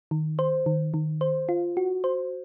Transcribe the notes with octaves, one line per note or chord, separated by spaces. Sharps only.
D#3
C5
D#3
D#3
C5
F4
F#4
C5